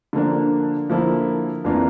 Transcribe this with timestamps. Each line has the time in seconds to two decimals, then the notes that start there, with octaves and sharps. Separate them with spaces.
0.13 D3 F3 A#3 D4
0.89 D3 F3 A#3 E4
1.64 F2 E3 A#3 D4 F4